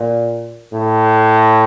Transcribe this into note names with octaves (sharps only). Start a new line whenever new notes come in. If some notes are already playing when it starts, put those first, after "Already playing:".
Already playing: A#2
A2